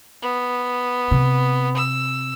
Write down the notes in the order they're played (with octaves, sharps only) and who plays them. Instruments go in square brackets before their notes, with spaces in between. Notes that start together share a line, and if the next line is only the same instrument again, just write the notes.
[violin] B3
[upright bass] C3
[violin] E6